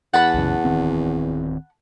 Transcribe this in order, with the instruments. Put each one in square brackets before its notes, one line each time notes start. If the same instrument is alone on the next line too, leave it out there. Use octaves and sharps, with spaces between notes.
[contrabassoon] E2 [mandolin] F#5 A5 B5
[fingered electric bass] C2 F#2 C#3
D1 D#3 C4